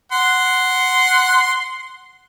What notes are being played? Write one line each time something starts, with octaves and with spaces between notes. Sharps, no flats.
F#5 C6